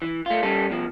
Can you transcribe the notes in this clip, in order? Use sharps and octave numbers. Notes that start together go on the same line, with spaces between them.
E3
A3 F4
G3 C#4 A4
B2 F3